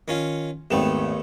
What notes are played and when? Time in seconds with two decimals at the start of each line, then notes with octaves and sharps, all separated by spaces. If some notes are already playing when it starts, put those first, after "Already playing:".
0.08 D#3 C#4 F4
0.71 G#1 D#2 A3 B3 G5 E7